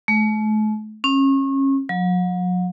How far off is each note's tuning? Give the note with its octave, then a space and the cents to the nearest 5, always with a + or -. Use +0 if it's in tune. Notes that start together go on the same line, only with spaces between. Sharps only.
A3 -40
C#4 -30
F#3 -40